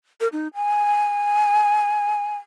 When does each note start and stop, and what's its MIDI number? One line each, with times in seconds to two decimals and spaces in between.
0.21 0.28 70
0.33 0.48 63
0.55 2.35 80